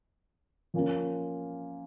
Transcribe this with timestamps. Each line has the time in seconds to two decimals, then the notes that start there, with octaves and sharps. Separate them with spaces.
0.74 F3 A#3 C#4 F4